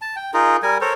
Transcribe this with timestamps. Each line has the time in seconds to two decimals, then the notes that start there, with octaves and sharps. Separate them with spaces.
0.01 A5
0.16 G5
0.34 D#4 F4 G#4 A#4
0.63 G3 A#4 G#5
0.81 A4 A#4 C5 C#5